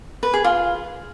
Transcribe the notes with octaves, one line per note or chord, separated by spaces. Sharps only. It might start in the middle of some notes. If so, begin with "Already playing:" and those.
B4
G#4
F4